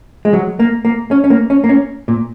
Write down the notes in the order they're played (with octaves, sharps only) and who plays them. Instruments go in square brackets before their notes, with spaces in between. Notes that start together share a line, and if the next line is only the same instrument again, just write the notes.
[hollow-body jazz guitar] G#3
F#3
A#3
A#3
C#4
C#4
A#3
C#4
A#3
C#4
A#2